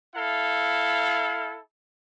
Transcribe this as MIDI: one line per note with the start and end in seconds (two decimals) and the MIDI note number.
0.15 1.58 64
0.15 1.58 69
0.15 1.58 77